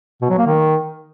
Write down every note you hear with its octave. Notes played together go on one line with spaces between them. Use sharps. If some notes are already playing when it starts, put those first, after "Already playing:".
B2
F#3
A#3
D#3